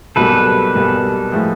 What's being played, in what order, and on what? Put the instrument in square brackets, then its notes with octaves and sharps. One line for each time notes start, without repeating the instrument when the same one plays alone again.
[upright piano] B1 B2 G3 A#3 [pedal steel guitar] A4 B4
[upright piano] B1 B2 G3 A#3
A2 F3 G#3